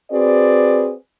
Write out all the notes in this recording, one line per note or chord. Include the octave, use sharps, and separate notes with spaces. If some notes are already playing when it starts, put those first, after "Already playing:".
C4 F#4 G#4 B4 D5